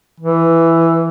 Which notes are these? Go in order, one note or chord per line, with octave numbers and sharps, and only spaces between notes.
E3